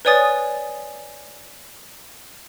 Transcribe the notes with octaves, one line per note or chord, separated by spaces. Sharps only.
B4 C#5 D5 G#5 D#6 A6